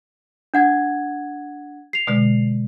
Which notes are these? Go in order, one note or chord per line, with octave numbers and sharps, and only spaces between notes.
D4 F#5 G#6
C7 F7
B2 D3 G#3